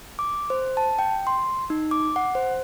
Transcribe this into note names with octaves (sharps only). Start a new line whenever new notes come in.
D6
C5
A5
G5
C6
D#4
D6
F#5
C5